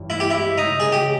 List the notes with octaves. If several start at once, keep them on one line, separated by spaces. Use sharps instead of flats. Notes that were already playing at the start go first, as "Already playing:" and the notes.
Already playing: G2 E3 C#4
G#3 E4
G4
C#4 E4
C#3 D#4
C#3 G#4
G4